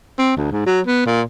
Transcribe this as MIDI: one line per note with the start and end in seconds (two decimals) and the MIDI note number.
0.19 0.33 60
0.37 0.51 38
0.52 0.65 44
0.66 0.81 54
0.87 1.03 59
1.06 1.22 46